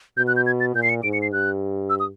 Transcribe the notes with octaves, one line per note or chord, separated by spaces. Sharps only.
B2 G6
F#6
G6
G#6
A6
A#2 G6
C7
C#7
G#2 D7
C#7
C7
G2 F#6
E6
D#6